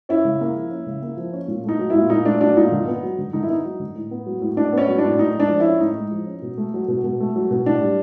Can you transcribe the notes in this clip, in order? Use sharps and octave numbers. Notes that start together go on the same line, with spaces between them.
C#4 E4
C#3
A#3
F3
C#4
C#3
A#3
F3
C#4
A#2
A3 D#4
F#3
E4
A#2
A#2 D#4
A3 D4
F#3 D4
A#2 D#4
D3
B3
F#3
D3
D3 D#4
E4
B3 D#4
F#3
D3
A2
B3
F#3
A2
A2 D4
B3
C#4
F#3
D4
A2
A2 D#4
G#3 D4
F3
E4
C#4
A2 D#4
G#3
F3
C#4
B2
A3
F#3
B2
B2
A3
F#3
B2
A2 D4
G3